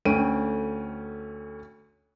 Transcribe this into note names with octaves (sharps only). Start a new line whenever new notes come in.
D2 A3 C#4 G5 D7 D#7